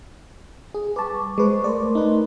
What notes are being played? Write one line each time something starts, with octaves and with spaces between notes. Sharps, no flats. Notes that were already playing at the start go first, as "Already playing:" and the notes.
G#4
G3 B4 A5 C#6 D6
G#3 B4 C5 C#6
A3 A#4 D5 C6
D#4 B4